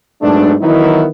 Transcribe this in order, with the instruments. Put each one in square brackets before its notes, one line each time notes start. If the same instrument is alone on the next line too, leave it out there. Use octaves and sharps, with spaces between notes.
[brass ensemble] G#2 F#3 A3 B3 D4
D#3 E3 F#3 B3 D#4 E4